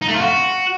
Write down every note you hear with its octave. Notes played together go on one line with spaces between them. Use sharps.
D#4
A3
F4
F#4